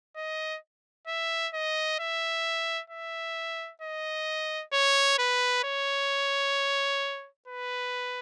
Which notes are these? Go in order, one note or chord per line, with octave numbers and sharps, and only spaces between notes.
D#5
E5
D#5
E5
E5
D#5
C#5
B4
C#5
B4